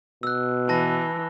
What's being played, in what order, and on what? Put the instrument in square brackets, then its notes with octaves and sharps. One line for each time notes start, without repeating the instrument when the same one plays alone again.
[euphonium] B2 [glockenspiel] E6 F#6
[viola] E3 [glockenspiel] A5 A#6